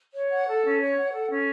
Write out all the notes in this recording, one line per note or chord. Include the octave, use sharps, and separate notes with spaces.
C#5
F#5
A4
C#4
C#5
F#5
A4
C#4